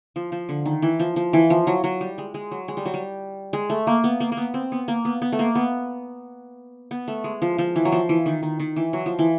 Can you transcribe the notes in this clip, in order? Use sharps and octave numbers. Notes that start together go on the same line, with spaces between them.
F3
F3
D3
D#3
E3
F3
F3
E3
F3
F#3
F#3
G3
G#3
G#3
F#3
G#3
G3
F#3
G3
G#3
A3
A#3
B3
A#3
A#3
B3
C4
B3
A#3
B3
B3
A3
A#3
B3
B3
A3
G#3
F3
F3
E3
F#3
F3
E3
D#3
D#3
D#3
E3
F#3
F3
E3